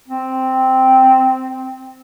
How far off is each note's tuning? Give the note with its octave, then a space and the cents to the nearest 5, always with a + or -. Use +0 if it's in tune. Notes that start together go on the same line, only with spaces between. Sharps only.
C4 -5